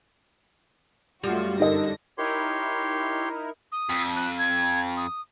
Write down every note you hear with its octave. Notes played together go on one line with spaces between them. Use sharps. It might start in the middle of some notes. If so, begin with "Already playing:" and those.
F#2 G3 A3 F4 F#4
G1 D3 D#4 A#4 D#5 A#6
D#4 E4 G4 A#4 C#5 C6
D#6
F2
F#6
G#6
D#6